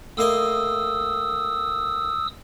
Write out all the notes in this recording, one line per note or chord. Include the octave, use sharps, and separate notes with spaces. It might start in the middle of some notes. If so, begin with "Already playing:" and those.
A2 A#3 D#5 D#6 E6